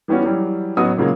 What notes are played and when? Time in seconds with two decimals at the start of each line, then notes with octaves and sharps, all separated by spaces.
0.08 E3 G3 B3 C#4 F#4
0.24 E3 F#3 G3
0.77 A1 F#3 B3 F#4 D#6
0.97 A#2 C#3 F#3 G#3 A#3